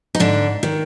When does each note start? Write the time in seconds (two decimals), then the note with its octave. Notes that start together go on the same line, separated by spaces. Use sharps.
0.15 D#4
0.20 G#2 D3 D4
0.63 D#3